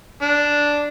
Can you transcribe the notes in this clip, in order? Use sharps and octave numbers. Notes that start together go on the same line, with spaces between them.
D4